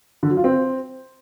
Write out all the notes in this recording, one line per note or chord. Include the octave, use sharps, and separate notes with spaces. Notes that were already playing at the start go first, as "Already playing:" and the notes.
D3
F#3
F4
C4